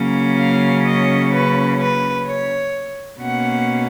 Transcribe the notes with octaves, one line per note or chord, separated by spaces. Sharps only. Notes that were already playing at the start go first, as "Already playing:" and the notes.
Already playing: C#3 F#3 A#3 C#4
F5
D#5
B4
B4
C#5
B2 A#3 C#4 F#5